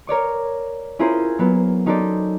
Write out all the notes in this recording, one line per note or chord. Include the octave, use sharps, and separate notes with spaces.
A#4 C#5 D5 C#6
C#4 E4 F4 G#4 A#4 C5
F#3 A#3 B3
C#4 D#4 F#4 A4 C5 D5